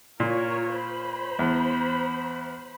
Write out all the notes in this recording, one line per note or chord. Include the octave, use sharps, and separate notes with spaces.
A#2 F4 A#4 C#5
C5 B5
E2